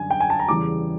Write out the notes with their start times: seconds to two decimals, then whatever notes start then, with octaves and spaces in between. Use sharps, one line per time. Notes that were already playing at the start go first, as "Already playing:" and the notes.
Already playing: F#2 D3 G3 G#5
0.10 G5
0.20 G#5
0.30 A5
0.40 A#5
0.48 E2 C#3 E3 G3 D6